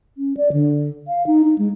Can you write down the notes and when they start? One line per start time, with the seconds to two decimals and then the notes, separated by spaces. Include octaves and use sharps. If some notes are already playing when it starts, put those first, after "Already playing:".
0.17 C#4
0.37 D5
0.53 D3
1.08 F5
1.27 D#4
1.45 D#4
1.58 G#3